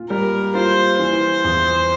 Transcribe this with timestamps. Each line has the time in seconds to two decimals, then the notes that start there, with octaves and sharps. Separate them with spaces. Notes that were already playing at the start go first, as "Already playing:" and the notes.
Already playing: A#2 F4
0.10 G3 A#4
0.55 F4 C5
0.99 E3 C5
1.44 E2